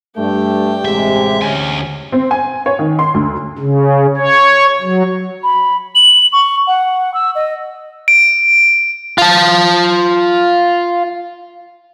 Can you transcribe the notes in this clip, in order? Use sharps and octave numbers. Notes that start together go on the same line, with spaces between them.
G2 A3 G4 G5
A1 C3 G#3 E5
D2 C#4 G#5
C4
G#5
C#5
D#3
C6
D2
C#3
C#5
F#3
B5
F#7
C#6
F#5
E6
D#5
D7
F4 A5